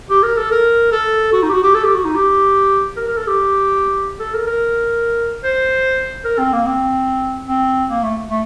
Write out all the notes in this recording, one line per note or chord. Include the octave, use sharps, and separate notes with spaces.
G4
A#4
A4
A#4
A4
F#4
D#4
G4
F#4
G4
A4
G4
F#4
D#4
G4
A#4
A#4
A4
G4
A4
A#4
A#4
C5
A#4
C4
A#3
C4
C4
A#3
A3
A3